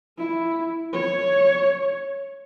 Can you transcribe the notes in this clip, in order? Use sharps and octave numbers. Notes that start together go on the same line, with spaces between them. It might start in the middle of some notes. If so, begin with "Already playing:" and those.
E4
C#5